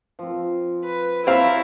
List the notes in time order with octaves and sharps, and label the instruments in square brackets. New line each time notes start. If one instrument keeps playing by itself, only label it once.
[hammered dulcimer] F3 C4
[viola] B4
[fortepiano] C4 F5 [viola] E4 [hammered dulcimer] C#5 A#5 B5